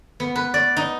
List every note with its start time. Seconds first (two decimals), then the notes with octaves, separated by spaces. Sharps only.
0.20 B3
0.36 B4
0.54 D5
0.77 D#4